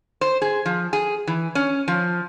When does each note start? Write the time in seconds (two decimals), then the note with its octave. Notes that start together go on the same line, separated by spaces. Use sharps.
0.21 C5
0.42 G#4
0.66 F3
0.93 G#4
1.27 E3
1.55 C#4
1.88 F3